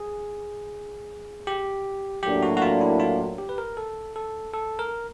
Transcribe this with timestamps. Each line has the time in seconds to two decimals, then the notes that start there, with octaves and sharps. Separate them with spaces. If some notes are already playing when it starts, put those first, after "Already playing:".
Already playing: G#4
1.47 G4
2.23 A2 F#3 A#3 D4 G4
2.42 F#4
2.57 F#4
2.62 F4
2.81 E4
3.00 F4
3.38 G4
3.49 B4
3.58 A#4
3.77 A4
4.16 A4
4.54 A4
4.79 A#4